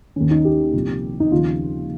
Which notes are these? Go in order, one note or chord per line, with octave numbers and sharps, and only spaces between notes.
D#2 D#3 C#4
D#4
G4
C2 A#2 F3
D#4
D#2 C#3 F3 F4